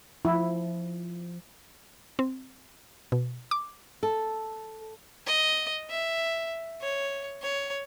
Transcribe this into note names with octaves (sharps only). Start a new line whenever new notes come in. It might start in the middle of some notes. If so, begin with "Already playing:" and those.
F3 E4
C4
B2
D6
A4
D#5
E5
C#5
C#5